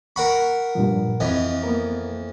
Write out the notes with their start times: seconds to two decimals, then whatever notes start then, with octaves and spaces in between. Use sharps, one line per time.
0.16 A#4 F#5 B5 C#6
0.75 G2 A#2 F3
1.20 F2 E3 C4 D#5
1.63 A#3 B3 A#4